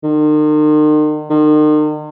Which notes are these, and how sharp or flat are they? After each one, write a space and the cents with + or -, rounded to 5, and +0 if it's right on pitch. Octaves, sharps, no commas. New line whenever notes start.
D#3 -40
D#3 -40